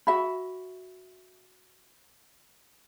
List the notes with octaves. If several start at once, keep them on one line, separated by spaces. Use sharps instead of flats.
F#4 E5 B5